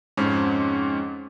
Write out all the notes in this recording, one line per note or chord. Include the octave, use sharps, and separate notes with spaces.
F2 G#2 C4 C#4